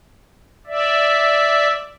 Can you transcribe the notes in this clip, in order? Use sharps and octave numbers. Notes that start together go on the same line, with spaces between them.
D5 E5